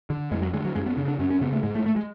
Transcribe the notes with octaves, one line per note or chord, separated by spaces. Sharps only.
D3
F2 G#3
F#3
D3 G#3
F#3
F#2 G#3
B3
C#3 D4
D4
F#2 C#4
C#4
C#3 B3
A3
G#2 G#3
A3
A3
G#3